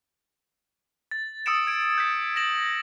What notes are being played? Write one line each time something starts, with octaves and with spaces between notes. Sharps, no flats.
A6
D#6 E6 A6 C#7 D7 E7
G#6 D7
G6 A6 B6
A#6 E7 F#7